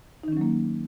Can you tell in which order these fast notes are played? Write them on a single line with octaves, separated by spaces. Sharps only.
D#4 D#3 C#4 F#3 A#3